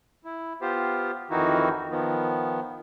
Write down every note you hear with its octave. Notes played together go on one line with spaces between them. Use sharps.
E4
B3 F4 G4 C5
F2 D#3 E3 D#4 E4 F#4
D#3 F3 B3